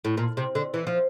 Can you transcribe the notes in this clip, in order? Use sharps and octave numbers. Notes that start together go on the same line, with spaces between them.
A2
A#2
C3
D3
E3
F3